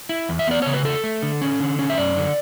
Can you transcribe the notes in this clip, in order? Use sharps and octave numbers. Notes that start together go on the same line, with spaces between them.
E4
E2
E5
B3 D5
C#3 C#5
B4
A3 A4
A3
D3
C#4
D3
C#4
E5
F#2 D5
D3